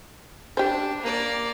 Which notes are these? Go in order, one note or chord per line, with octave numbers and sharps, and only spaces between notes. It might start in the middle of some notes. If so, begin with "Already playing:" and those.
D4 G4 C5
A#3 D5